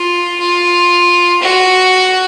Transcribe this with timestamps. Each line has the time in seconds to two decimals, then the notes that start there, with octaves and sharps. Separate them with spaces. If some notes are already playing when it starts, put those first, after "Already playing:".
Already playing: F4
0.40 F4
1.42 F#4